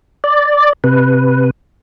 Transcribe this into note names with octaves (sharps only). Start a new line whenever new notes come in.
D5
C3 B4